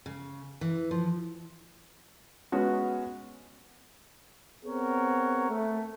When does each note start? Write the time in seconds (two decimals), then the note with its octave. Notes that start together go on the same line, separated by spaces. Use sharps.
0.06 C#3
0.61 E3
0.91 F3
2.52 G#3 B3 C#4 F#4
4.65 B3 C4 G#4 A#4 C#5 F#5
5.50 A3